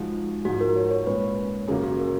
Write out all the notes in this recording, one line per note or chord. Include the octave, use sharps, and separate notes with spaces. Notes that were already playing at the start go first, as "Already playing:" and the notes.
Already playing: F3 G#3 D#4 F#4
G#2 F3 G#3 D#4 F#4
A#4
C#5
C#5
A#2 G#3 C#4 B4
F#2 C#3 F#3 A#3 G#4
F#4
A#4